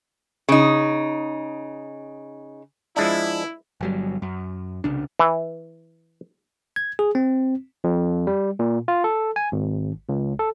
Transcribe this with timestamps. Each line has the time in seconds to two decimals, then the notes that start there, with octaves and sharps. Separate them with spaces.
0.49 C#3 D#4
2.97 F3 G#3 D4 E4
3.81 G1 F#3 G3
4.22 F#2
4.84 C2 C#3 D4
5.19 E3
6.76 G#6
6.99 G#4
7.15 C4
7.84 F2
8.27 G3
8.59 A#2
8.88 F4
9.04 A4
9.36 G#5
9.52 G#1
10.09 C#2
10.39 A4